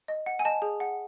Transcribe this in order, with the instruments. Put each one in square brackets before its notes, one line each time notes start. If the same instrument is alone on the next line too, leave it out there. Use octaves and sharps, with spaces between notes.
[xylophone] D#5
F#5
G#5
D#5 A5
G#4
F#5